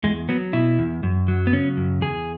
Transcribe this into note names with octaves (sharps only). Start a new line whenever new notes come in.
E2 G#3
F#3 B3
B2 E4
E2
F#2
F#3
B3
C#3 C#4
F#2
E2 G#4